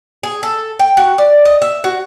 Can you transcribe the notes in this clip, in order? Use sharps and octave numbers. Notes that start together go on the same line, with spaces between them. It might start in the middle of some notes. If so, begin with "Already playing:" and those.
G#4
A4
G5
F#4
D5
D#5
E5
F#4